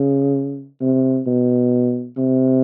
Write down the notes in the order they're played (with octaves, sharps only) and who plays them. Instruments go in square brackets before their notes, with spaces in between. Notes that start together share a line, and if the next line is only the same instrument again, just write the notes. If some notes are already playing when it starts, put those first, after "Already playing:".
Already playing: [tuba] C#3
C3
B2
C3